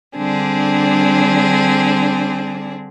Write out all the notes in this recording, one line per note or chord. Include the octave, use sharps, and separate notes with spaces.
D3 G3 C4 D4 G#4